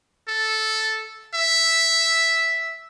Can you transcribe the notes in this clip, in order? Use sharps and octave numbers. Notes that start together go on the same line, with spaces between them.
A4
E5